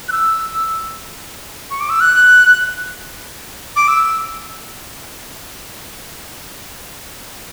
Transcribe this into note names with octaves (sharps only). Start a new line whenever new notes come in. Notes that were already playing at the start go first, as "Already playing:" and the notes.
F#6
E6
C#6
D6
E6
F#6
D6
E6